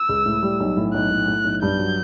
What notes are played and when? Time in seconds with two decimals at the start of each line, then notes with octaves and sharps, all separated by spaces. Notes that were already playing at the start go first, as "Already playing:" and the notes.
Already playing: E6
0.09 C#2
0.26 A2
0.43 G3
0.60 B1
0.77 A2
0.94 B1 F#6
1.11 A2
1.28 A2
1.44 B1
1.62 G2 G6
1.79 F#3